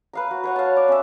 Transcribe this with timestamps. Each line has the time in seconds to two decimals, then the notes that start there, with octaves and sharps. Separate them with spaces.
0.13 B4 F5 A#5
0.31 F#4
0.44 B4 C#5 F#5
0.56 F5 A5
0.77 D5
0.88 C#4 E5